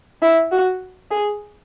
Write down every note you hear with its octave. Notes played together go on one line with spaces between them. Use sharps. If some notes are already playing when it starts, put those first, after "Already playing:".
E4
F#4
G#4